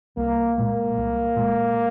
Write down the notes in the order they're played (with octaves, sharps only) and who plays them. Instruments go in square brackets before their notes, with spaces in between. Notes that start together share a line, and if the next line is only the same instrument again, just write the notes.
[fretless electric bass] C2 [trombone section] A#3
[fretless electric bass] A#2 G#3 [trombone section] A#3
[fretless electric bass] C2
A#2 G#3